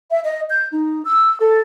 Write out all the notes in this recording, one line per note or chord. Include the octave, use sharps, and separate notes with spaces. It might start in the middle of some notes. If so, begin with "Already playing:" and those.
E5
D#5
G6
D#4
E6
A4